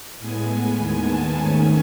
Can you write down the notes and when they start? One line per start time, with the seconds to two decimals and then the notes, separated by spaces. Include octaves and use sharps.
0.19 A2 G#3 B3 G#5
0.78 D#2 D#3 G#3 B3 G#5
1.07 A5
1.35 G#2 D#3 A3 C#4 G#5